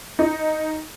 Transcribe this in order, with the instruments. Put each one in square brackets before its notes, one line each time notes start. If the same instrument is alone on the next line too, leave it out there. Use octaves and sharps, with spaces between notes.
[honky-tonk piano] D#4